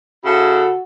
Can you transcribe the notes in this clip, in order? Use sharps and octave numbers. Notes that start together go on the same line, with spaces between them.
C#3 E4 F#4 A4